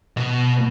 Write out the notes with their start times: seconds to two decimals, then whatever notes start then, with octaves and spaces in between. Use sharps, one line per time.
0.17 B2